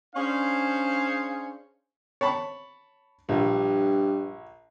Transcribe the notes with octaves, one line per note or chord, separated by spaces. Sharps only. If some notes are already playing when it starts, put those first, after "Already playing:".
C#4 D4 G#4 C5 F5
C#5 A5 B5
A#1 G2